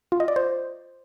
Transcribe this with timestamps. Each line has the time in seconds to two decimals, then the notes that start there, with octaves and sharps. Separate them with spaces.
0.12 F4
0.20 D#5
0.28 D5
0.36 C5